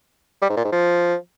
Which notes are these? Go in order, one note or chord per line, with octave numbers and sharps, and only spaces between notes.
G3
G#2
A#2
G#2
F3